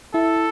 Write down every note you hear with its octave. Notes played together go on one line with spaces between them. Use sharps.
E4 A4